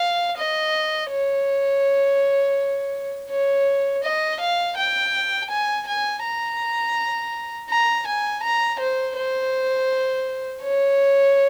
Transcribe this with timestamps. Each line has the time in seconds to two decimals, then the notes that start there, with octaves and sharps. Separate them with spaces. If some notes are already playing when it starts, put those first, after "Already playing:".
Already playing: F5
0.38 D#5
1.11 C#5
3.30 C#5
4.04 D#5
4.40 F5
4.77 G5
5.50 G#5
5.87 G#5
6.24 A#5
7.70 A#5
8.07 G#5
8.43 A#5
8.80 C5
9.16 C5
10.63 C#5